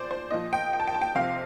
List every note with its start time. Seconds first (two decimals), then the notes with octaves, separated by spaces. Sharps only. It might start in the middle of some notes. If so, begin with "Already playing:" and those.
Already playing: A#2 F3 C5 D5
0.11 C5
0.31 A#2 F3 D#5
0.53 G5
0.73 G5
0.80 A5
0.88 G5
0.94 A5
1.02 G5
1.15 F2 C3 F3 F5